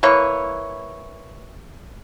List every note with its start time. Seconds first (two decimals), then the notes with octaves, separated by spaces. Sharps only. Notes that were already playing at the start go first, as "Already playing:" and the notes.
0.03 E3 A#3 C#5